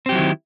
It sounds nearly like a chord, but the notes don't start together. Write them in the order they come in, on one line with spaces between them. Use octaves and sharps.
C4 G4 F#3 E4 D#3